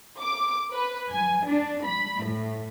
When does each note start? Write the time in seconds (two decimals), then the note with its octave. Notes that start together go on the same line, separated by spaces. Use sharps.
0.21 D6
0.72 B4
1.11 G#5
1.45 D4
1.86 B5
2.24 A2